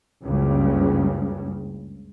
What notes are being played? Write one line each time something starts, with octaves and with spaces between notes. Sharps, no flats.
F#1 C#2 G2 C#3